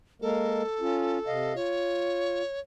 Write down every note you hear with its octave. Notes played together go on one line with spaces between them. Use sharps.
G#3 A#3 A4 A#4
C#4 F4
C3 D#5 F5
F4 C#5